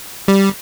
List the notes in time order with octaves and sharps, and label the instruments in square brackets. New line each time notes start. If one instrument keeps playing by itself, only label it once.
[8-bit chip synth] G3